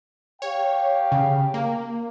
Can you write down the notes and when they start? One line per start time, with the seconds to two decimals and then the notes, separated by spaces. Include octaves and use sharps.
0.42 G4 C#5 F5 G5
1.12 C#3
1.54 A#3